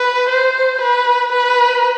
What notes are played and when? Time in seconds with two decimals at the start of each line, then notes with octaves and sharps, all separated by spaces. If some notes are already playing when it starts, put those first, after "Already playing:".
Already playing: B4
0.30 C5
0.82 B4
1.32 B4